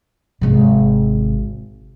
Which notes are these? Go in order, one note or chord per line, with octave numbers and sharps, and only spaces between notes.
G#1 C3